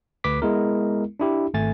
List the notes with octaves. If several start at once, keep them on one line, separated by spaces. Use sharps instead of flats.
D2 B4 D6 B6
G#3 B3 E4 A#4
D4 E4 G4
G#1 A3 G#5 A6